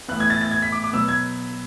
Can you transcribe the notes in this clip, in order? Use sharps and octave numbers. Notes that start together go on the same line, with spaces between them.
A2 E3 B3 F#6
G#6
A6
A6
G#6
B6
D6
D6
B2 F#3 B3 E6
G#6